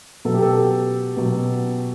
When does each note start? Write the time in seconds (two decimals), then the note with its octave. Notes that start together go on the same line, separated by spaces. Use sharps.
0.25 B2 F#3 A4
0.34 G4
0.42 A4
1.17 B2 F#3